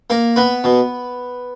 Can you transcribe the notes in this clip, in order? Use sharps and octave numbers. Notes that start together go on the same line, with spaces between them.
A#3 A#4
B3 B4
B2